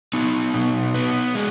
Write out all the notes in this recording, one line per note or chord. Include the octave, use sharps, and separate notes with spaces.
B3 D#4
B2
B3
G#3